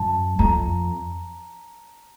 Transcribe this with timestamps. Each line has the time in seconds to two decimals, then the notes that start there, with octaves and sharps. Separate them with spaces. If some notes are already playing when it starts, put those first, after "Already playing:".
Already playing: F#2 A5
0.39 F2 A#5